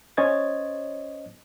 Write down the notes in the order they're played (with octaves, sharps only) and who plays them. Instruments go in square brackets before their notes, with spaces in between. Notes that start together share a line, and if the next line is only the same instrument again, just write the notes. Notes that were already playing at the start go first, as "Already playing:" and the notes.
[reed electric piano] C#4 C5 C#5 D#5 G#6 A6